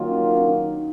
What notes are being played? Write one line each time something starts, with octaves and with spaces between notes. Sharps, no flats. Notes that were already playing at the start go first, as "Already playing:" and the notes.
Already playing: D#3 F#3 A#3 F4
C#4
D#4
C#4
D#4